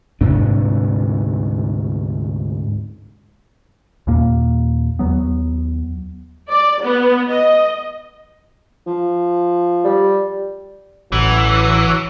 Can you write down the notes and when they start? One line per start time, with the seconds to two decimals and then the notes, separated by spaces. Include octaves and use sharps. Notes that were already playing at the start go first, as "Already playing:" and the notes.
0.21 D2 G#2 C3 D4
4.07 D#2 A#2 A#3
4.99 D#2 F#3 B3
6.48 D5
6.81 B3
7.28 D#5
8.87 F3
9.84 G3
11.12 A1 E3 F#3